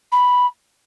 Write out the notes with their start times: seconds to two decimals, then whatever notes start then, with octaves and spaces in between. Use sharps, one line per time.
0.12 B5